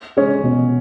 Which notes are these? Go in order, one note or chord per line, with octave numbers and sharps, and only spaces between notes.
G#3 C#4
B2